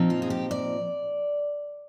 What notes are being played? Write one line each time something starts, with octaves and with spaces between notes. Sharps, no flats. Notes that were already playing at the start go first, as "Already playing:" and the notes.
Already playing: A#2 F3 C4 D#4
F4
G#4
G4
D5